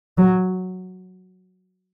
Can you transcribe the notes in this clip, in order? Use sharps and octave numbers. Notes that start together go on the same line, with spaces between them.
F#3